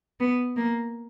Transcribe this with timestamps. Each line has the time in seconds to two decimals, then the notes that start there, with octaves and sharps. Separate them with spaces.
0.20 B3
0.57 A#3